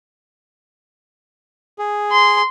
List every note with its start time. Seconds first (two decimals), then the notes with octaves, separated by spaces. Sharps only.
1.79 G#4
2.11 C6